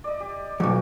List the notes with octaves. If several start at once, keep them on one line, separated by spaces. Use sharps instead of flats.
D5 D#5
G4
B1 E2 F3 F#4 D6